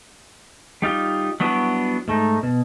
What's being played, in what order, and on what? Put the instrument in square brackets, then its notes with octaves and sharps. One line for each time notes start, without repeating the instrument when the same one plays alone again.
[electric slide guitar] G3 D#4 F4 G4
F#3 G3 B3 D4 E4 F#4
G#2 A3 D#4
B2